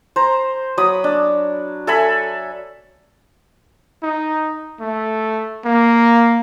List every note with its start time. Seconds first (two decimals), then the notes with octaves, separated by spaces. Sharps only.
0.16 C5 A#5
0.78 F#3 B5 D#6
1.04 D4
1.87 A4 E5 G#5 B5
4.03 D#4
4.80 A3
5.65 A#3